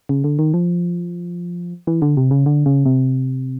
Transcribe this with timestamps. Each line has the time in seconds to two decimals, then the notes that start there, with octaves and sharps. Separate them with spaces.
0.09 C#3
0.24 D3
0.39 D#3
0.54 F3
1.87 E3
2.02 D3
2.17 C3
2.31 C#3
2.46 D3
2.66 C#3
2.86 C3